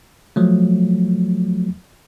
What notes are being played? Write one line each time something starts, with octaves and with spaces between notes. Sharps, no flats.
F3 F#3 A3